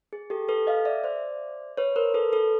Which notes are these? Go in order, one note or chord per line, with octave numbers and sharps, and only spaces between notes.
G#4
G4 A4
A4 B4
D#5 F5
D5 E5
C5 D5
B4 C#5
A#4 C5
A4 B4
A4 B4